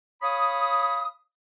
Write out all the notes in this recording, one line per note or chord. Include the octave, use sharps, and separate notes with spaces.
C#5 F5 B5 D#6